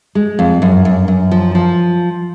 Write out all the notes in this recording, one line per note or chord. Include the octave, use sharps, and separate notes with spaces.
G#3
F2
F#2
F#2
F#2
F3
F3